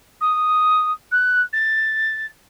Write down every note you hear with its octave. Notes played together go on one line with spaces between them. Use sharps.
D#6
F#6
A6